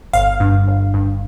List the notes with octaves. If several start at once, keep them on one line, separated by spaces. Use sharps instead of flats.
G1 F5
G2
G1
G2